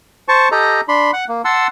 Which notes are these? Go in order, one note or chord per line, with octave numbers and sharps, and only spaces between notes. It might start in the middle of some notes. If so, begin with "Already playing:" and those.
C5 A5 C#6
G4 A4 D#5 A#5
D4 B5 C6
F#5 F#6
A#3
F#5 A5 C6 E6